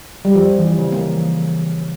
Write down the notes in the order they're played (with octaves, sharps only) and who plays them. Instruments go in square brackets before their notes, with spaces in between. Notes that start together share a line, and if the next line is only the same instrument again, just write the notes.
[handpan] G3
[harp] F2 [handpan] F3
[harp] E3
C#3
[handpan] A#3